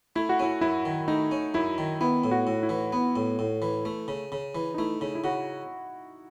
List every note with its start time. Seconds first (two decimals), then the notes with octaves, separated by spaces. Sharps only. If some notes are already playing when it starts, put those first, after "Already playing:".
0.16 A3 E4
0.29 F#4
0.39 C#4 E4
0.61 F#2 E4
0.85 D#3
1.08 A3 D#4
1.31 C#4
1.54 F#2 E4
1.78 D#3
2.01 B3 E4
2.24 A2
2.31 F#4
2.47 A2
2.63 E4
2.69 E3
2.93 B3
3.16 A2
3.39 A2
3.62 E3
3.85 A3
4.08 C#3
4.32 C#3
4.55 E3
4.74 D#4
4.78 A3 E4
5.01 C#3
5.15 E4
5.24 C#3 F#4